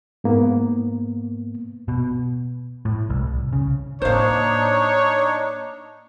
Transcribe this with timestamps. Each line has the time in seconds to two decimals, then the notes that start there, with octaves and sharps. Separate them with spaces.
0.24 G#2 A#3 B3
1.88 B2
2.85 A2
3.10 C2
3.53 C#3
4.02 A2 A#3 D4 D#4 C5 C#5 F5